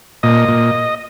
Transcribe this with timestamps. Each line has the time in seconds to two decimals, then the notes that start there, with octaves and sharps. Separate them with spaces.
0.23 A#2 D#5
0.49 A#2